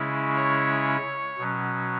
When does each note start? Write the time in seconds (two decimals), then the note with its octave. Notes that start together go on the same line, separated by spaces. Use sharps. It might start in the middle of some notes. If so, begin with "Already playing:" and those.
Already playing: C#3 G#3 C#4 E4
0.36 C#5
1.38 B2 F#3 C#4